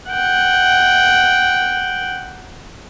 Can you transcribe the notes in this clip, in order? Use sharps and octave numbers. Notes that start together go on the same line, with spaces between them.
F#5 G5